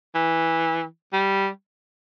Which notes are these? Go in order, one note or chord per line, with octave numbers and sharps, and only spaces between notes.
E3
G3